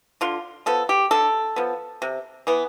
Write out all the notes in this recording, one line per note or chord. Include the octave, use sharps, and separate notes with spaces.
D3 F4
F3 B3 A4
G4
D3 A4
F3 B3
C3
E3 B3